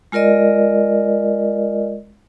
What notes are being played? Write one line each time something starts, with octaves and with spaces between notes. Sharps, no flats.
G#3 F4 A#4 D5 D#5